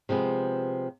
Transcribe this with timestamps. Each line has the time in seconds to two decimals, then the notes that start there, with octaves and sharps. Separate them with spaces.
0.09 C3 F3 G#3 B3